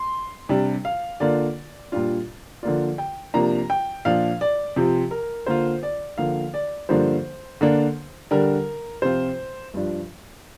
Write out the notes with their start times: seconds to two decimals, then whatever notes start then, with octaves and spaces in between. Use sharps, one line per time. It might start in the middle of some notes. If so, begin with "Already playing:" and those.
Already playing: C6
0.49 C3 G3 D4
0.85 F5
1.20 D3 A#3 D4 F4 D5
1.92 A#2 G3 D4 F4
2.63 D3 F3 A#3 F4 D5
2.98 G5
3.34 C3 F3 A#3 D4 A#5
3.70 G5
4.05 A#2 F3 D4 F5
4.41 D5
4.76 C3 F3 C4
5.11 A#4
5.46 D3 A#3 F4 C5
5.83 D5
6.18 D3 F3 A#3 F5
6.54 D5
6.89 G2 D3 F3 A#3 D4 C5
7.61 D3 A#3 D4
8.31 D3 G3 D4 A#4
9.02 C3 F3 C4 F4 C5
9.74 G2 F3 D4